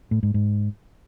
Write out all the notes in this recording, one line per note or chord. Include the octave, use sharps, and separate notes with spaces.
A2
G#2
G#2